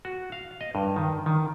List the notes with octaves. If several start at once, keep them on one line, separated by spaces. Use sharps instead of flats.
F#4
F5
D#5
G2
D#3
D#3